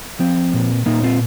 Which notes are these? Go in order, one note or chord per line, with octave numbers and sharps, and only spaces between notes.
F3 C4
A#2
A#2 A#3 D#4
C4 F4